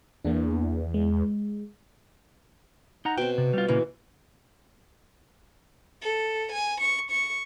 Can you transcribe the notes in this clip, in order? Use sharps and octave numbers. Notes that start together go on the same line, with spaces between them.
E2 A#3 D4
G#3
D#4 F#5 A#5
B2 C4 G5
C3
G3 F4
A#2 C#3 E3 A#3
A4
G#5
C#6
C#6